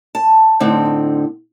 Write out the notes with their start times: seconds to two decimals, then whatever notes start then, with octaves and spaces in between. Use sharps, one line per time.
0.15 A5
0.60 A2 D3 C4 D#4